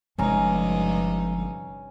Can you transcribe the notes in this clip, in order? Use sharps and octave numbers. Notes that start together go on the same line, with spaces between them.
G1 G2 C3 F3 G#3 C#4 D#4 A#5